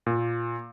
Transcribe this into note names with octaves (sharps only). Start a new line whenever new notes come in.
A#2